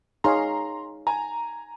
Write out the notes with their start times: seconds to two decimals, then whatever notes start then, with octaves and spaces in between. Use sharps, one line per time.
0.24 D#4 G#4 C#5 F5 A#5 C6
1.07 G#5 A#5